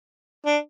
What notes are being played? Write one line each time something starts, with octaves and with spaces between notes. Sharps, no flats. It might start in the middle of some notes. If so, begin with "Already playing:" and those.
D4